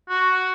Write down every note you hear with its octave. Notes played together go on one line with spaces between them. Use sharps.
F#4